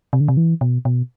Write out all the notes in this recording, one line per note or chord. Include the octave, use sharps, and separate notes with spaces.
C3
D3
C3
E3
B2
B2